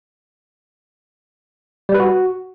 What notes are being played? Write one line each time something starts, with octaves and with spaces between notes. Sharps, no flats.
G3
B4
F#4